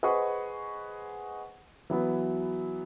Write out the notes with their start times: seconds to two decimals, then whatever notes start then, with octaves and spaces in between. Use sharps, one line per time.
0.03 G#4 B4 C5 D#5 F#5 C#6
1.90 E3 F#3 B3